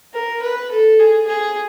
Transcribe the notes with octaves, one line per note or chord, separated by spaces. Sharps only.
A#4
B4
A4
G#4
G#4